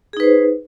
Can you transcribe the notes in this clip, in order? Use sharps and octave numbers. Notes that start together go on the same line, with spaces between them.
D#4 G#4 B4 C5